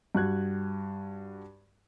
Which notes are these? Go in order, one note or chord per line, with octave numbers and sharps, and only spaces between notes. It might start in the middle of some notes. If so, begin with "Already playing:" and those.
G2 F#4 F#6 G#6